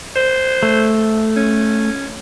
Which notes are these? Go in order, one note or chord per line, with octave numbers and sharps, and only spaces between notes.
C5
A3
C#4